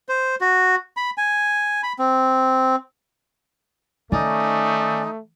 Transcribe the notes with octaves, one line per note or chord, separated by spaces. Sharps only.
C5
F#4
B5
G#5
B5
C4
D#3 A3 C#4 D#4 D5